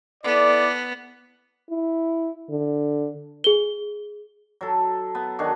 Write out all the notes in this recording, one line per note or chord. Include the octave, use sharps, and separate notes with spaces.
B3 E4 A4 D5
E4
D3
G#4 G7
F#3 A4
B3
D#3 D4 F#4 G#4